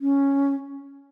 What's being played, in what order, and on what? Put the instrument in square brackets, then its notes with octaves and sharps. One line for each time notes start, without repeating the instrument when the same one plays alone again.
[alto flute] C#4